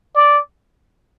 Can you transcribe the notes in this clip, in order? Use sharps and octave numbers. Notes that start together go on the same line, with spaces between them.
D5